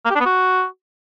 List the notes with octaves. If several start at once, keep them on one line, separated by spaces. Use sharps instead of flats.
A#3
G4
D4
B3
F#4